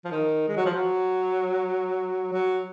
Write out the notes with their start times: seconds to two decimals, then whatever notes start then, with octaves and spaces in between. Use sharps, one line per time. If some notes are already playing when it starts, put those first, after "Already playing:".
0.05 F3
0.12 D#3
0.48 G#3
0.57 F#3
0.65 F3
0.73 F#3
2.33 F#3